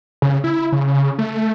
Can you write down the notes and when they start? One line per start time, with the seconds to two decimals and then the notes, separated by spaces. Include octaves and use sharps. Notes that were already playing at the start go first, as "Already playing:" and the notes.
0.22 C#3
0.44 E4
0.72 C#3
1.19 A3